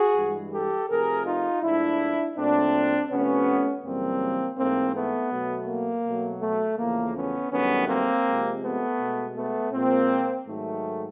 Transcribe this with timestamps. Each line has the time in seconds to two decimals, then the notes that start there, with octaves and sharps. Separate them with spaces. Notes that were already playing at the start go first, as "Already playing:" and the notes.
Already playing: F#4 G#4
0.16 G2 E3 G#3
0.53 G4 A4
0.90 C3 F3 A3 G#4 A#4
1.26 D#4 F4
1.63 G#2 F3 A3 D4 E4
2.36 A#2 F#3 A3 C4 D4
3.10 C3 F3 A3 B3 C#4
3.84 F#2 C#3 E3 G3 A#3 C4
4.57 G#2 E3 A3 A#3 C4
4.95 A3 B3
5.31 B2 F#3 A3
5.68 A#3
6.06 B2 F#3 A3
6.42 A3
6.78 E2 C#3 F3 A3 A#3
7.16 B3 C#4
7.52 G2 D#3 F#3 A3 B3 C#4
7.88 A#3 C4
8.26 C3 F3 G#3
8.63 A3 B3
9.00 B2 G#3
9.36 A3 B3
9.73 A#2 F3 G#3 A#3 C4
10.47 G#2 D#3 F#3 A3